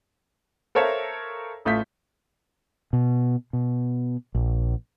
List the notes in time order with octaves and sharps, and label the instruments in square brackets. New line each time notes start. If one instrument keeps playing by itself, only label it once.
[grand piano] A4 A#4 C5 C#5 E5 F5
A1 A3 F4 G6 B6
[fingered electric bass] B2
B2
A#1